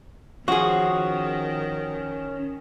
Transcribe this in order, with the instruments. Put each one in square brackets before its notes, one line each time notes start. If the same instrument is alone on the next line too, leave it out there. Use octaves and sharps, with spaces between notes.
[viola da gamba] D#3 [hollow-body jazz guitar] F3 G#4 [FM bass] C#4 [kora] F#4